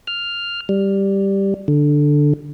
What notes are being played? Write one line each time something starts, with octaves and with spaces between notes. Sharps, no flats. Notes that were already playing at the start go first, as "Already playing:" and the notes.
F6
G3
D3